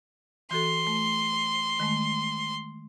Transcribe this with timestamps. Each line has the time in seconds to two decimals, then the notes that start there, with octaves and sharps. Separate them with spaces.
0.51 E3 F#4 A4 C6
0.87 A3
1.80 D#3 G#3 A3